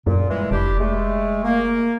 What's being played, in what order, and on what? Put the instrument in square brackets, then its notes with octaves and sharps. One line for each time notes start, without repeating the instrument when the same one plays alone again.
[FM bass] F#2 [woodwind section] A#2
[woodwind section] E3 G3 G#3
[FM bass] F1 [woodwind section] D4 E4 G4
[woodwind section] G#3 A3
A#3